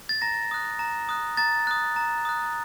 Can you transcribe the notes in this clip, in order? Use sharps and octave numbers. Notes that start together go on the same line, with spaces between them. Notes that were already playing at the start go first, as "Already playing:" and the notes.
A6
A#5 A#6
D#6 F#6
A#5
D#6 F#6
A#5 A6
D#6 F#6
A#5
D#6 F#6